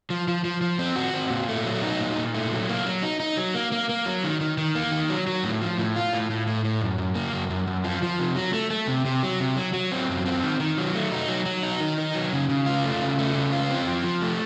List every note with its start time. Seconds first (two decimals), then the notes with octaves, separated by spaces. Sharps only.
0.10 F3
0.28 F3
0.45 F3
0.61 F3
0.79 C4
0.96 F#4
1.14 C4
1.30 A#2
1.48 A3
1.66 F#3
1.82 D#4
2.00 A#2
2.17 A#2
2.35 A3
2.51 F#3
2.69 A#3
2.85 F#3
3.03 D#4
3.20 D#4
3.37 F#3
3.55 A#3
3.72 A#3
3.89 A#3
4.06 F#3
4.24 D#3
4.41 D#3
4.58 D#3
4.75 A#3
4.92 D#3
5.10 F#3
5.27 F#3
5.44 A2
5.62 F3
5.78 A2
5.96 F4
6.13 A2
6.30 A2
6.47 A2
6.65 A2
6.82 F#2
6.98 F#2
7.15 A#3
7.33 F#2
7.50 F#2
7.67 F#2
7.84 F3
8.02 F3
8.19 C3
8.36 F#3
8.53 A3
8.71 A3
8.88 C3
9.05 C3
9.23 F#3
9.40 C3
9.56 F#3
9.73 F#3
9.92 C4
10.09 F#2
10.26 C4
10.43 D#3
10.60 D#3
10.78 F#3
10.95 A3
11.12 D#4
11.28 F#3
11.46 F#3
11.63 D#4
11.80 D#3
11.98 D#4
12.15 F#3
12.33 C#3
12.49 C#3
12.66 F4
12.84 A3
13.02 C#3
13.18 A3
13.35 C#3
13.53 F4
13.70 C4
13.88 F3
14.04 F3
14.22 A3